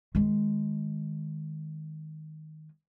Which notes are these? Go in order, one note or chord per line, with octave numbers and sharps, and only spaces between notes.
D#3 G#3